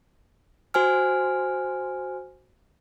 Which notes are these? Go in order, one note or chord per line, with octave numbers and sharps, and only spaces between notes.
F#4 C5 G#5 F6